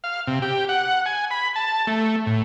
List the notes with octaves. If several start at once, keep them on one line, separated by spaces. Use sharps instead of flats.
F5
C3
G4
F#5
G#5
B5
A5
A3
A2